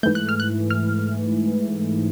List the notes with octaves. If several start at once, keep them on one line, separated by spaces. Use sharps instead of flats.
G#2 E3 A3 G6
F#6
F6
F#6
F6